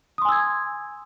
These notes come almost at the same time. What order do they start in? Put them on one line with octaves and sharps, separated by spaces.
D#6 C6 G#5 E6 G#6